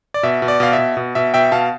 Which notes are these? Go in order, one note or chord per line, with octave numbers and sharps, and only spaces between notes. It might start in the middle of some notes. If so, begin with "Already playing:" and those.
D5
B2 E5
B2
D5
B2 F5
E5
B2
B2
B2 E5
B2 E5 G5
B2 F5 A5